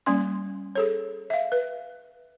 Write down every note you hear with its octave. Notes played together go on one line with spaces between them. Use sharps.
G3 A#3 C#4 C6
G#4 A4 C#5
E5 F5
B4